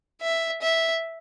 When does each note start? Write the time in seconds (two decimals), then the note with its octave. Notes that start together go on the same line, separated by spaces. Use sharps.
0.21 E5
0.62 E5